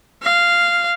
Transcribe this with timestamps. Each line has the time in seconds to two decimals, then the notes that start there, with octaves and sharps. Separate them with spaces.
0.23 F5